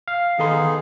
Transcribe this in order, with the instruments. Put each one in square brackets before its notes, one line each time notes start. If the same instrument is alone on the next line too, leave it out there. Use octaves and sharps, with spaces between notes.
[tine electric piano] F5
[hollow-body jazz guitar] D#3 A4 C6 [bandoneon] B3 D#4 G#4